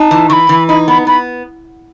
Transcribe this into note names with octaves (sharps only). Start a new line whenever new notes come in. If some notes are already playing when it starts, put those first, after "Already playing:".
Already playing: D#4 A5
E3
E3 B5 C#6
E3
D#4 B5
B3 B5
B3 B5